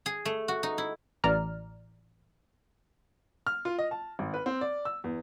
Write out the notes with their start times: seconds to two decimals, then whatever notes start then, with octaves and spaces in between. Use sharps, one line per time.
0.06 G#4
0.25 A3
0.48 F#4
0.63 D#4
0.78 E4
1.24 A1 D5 A#5 F6
3.47 F6
3.65 F4
3.78 D#5
3.91 A5
4.19 G#1
4.34 B4
4.46 C4
4.61 D5
4.85 E6
5.04 E2